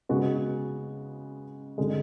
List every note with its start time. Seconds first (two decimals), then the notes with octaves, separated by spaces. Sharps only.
0.09 C#3 G#3 B3 F#4
1.78 D3 G#3